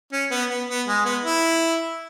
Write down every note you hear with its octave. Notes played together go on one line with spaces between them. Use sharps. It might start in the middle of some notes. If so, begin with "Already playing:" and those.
C#4
B3
B3
B3
G#3
B3
E4